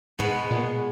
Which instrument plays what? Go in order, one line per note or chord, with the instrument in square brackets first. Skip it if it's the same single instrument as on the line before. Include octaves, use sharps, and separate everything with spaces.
[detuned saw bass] G#2 [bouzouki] B2 G#3 B3
[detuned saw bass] A#2